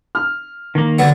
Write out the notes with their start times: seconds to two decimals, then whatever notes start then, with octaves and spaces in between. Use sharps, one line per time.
0.15 F6
0.75 D#3 A#3
0.99 D3 F#3 B3